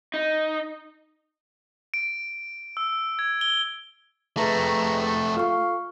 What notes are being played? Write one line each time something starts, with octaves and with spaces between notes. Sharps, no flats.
D#4
D7
E6
G#6
G7
F2 A3 G#4 B4 E5 A#5
F4 A4 F5 C#6